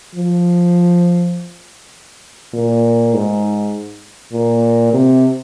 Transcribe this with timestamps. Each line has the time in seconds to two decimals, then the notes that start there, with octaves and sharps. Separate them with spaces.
0.15 F3
2.54 A#2
3.14 G#2
4.33 A#2
4.93 C3